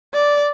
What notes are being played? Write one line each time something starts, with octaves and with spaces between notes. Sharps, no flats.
D5